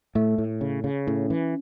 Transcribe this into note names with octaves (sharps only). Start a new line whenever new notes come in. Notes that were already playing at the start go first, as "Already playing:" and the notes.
A2 A3
A2
C#3
C#3
A2 C#4
E3